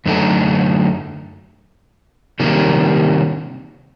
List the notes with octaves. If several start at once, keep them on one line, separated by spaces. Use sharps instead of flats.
F#2 D3 A3 D#4 A4
C3 D#3 G3 A#3